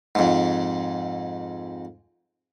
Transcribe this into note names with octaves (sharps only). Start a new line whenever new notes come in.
F2 G#2